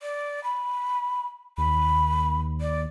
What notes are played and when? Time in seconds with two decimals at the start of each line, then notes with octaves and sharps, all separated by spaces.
0.01 D5
0.44 B5
1.58 D#2 B5
2.61 D5